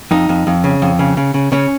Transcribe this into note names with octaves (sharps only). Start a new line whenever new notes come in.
F2 D#4
F2
F2
C#3
F2
C#3
C#3
C#3
C#3 C#4